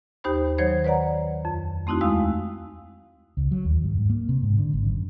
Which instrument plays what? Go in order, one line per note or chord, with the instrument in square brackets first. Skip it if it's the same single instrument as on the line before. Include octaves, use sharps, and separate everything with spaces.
[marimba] D#2 D#4 G4 C5 B5
D#3 F#3 C5 C#5 G#6
B4 C#5 D5 F#5 A#5
F2
A3 C4 D#4 E4 F#4
D#2 G#3 F5 D#6 E6
[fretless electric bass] C#2
F#3
D#2
G2
G#2
A#3
C3
G#2
D3
G#1
F#2